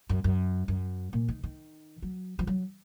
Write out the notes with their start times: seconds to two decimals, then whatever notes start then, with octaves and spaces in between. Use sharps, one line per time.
0.09 F#2
0.24 F#2
0.68 F#2
1.13 A#2
1.28 D#3
1.43 D#3
2.02 F#3
2.39 F3
2.47 F#3